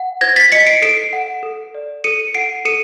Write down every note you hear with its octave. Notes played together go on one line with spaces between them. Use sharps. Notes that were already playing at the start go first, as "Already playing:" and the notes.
Already playing: F#5
C5 G#6 A#6
A6 B6
D#5 B6 C#7
C7 D7
A4 C7 D7
F#5
A4
D5
A4 C#7 D#7
F#5 C7 D7
A4 C#7 D#7